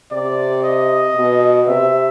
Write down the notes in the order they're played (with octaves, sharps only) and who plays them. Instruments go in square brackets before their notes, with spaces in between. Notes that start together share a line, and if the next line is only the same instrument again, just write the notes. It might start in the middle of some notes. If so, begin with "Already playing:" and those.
[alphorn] C3 [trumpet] D5
[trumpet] D#5
[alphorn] B2
[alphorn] C3 [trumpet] E5